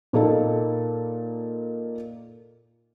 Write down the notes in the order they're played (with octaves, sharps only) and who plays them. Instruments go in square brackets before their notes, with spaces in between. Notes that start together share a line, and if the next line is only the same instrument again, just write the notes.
[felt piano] A#2 A#3 D#4 A4